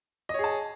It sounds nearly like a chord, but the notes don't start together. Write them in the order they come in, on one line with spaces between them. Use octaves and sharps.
D#5 C#5 G#4 A5